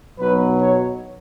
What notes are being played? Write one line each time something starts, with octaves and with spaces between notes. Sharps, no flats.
B1 B2 F#3 B4
C#5